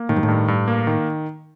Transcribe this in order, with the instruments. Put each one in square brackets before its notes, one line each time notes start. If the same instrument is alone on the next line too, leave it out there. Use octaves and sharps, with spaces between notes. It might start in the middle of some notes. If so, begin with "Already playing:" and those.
Already playing: [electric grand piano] A#3
[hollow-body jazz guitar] A2 [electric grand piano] D#3
[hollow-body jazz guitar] G2
A2
[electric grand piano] G2
G2
A#3
D#3